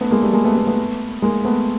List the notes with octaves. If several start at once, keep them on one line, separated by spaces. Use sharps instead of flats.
A3 B3
G#3 A#3
G3 A3
G#3 A#3
A3 B3
A3 B3
A3 B3
G#3 A#3
A3 B3